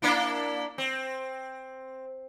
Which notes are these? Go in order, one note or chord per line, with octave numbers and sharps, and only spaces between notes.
A#3 D4 E4
C4